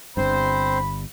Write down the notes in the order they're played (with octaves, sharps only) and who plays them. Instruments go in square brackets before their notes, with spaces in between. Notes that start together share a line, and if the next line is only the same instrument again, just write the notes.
[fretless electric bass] G1 G2 [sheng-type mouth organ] C4 C5 [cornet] B5